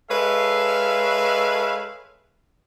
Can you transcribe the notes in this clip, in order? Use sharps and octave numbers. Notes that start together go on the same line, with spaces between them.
G#3 A4 B4 C#5 E5 F5